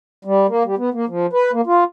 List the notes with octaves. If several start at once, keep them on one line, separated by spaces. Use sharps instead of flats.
G3
A#3
G3
B3
A#3
F3
B4
A#3
F4